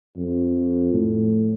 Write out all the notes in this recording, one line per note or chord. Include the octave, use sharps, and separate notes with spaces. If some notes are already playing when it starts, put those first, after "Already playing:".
F2
A2